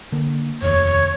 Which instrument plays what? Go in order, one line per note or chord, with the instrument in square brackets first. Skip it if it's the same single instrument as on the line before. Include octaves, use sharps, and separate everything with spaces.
[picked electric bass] D3 A#3
[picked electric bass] F1 D#2 [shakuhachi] C#5